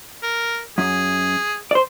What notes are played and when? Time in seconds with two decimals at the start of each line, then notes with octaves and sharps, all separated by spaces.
0.23 A#4
0.78 F#2 G#4
1.71 C5 D5